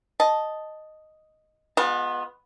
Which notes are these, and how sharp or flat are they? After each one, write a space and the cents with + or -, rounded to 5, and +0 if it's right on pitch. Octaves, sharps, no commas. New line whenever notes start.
D#5 +0 A5 +0
G#3 +0 B3 -5 F4 +35